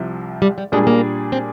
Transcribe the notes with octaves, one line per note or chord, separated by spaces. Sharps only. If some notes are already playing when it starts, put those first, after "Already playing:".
Already playing: C2 C3 F3
G3
G3
A#2 G3 G#3 D4 G#4
A#3
C4